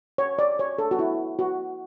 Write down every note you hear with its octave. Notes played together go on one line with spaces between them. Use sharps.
C#5
D5
C#5
A4
F#4
E4
F#4